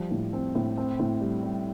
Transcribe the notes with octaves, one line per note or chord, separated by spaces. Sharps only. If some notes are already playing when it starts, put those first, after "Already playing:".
Already playing: F3 G3
A2
C4
A2
C4
A2
G3
G3